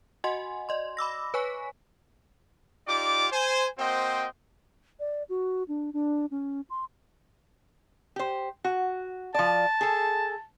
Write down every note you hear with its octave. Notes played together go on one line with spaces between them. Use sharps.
F#4 D#5 F#5 G#5 C6
D5 D#5 C6
B5 D6 E6 A#6
B4 C#5 G#5 C#6 B6
D#4 F4 G4 D5 D6
C5 G#5
A#3 C4 F#4 C5 D#5 G5
D5
F#4
D4
D4
C#4
C6
G4 C5
F#4
F3 D5 A5
G#4 A4